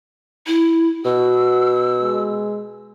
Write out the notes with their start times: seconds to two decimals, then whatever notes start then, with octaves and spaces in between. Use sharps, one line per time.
0.47 E4
1.05 B2 F#4 E6
2.01 G#3